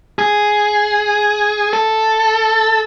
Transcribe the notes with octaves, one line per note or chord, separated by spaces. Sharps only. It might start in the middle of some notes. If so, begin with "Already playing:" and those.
G#4
A4